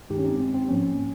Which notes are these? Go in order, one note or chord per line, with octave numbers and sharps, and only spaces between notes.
G2 D#3 G#3 D#4 G4
C#4
C4 D#4
C4
C4
G#2 F3 A#3 C#4